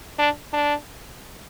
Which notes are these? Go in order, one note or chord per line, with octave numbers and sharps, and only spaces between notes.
D4
D4